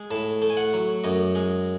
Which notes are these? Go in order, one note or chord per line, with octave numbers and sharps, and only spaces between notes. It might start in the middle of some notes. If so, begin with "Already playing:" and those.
Already playing: G#3
A2 A5
A3
G#5
F#5
F#3
F#2 D#5
G#3